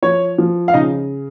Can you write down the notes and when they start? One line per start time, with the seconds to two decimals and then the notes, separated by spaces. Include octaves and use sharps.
0.02 F3 C#5
0.38 F3
0.68 F5
0.73 C#3 D#4 D#5